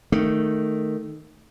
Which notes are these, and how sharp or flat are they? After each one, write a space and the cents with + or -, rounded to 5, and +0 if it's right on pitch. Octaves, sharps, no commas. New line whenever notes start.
D#3 -5 A3 +0